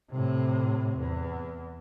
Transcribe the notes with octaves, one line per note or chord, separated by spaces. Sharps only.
A2 C3
E2